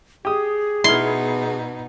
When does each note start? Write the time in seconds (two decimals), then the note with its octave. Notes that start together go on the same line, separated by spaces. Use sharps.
0.25 G4 G#4 D#6
0.84 B2 B3 D#4 E4 C6 F6